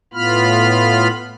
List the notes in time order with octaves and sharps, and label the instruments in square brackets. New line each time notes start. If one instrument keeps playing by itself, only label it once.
[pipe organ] A2 B3 F4 B5 F6